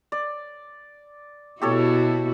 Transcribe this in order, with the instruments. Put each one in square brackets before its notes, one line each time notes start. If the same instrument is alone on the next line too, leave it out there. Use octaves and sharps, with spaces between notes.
[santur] D5
[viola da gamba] B2 E4 F#4 [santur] G4 A4 C#5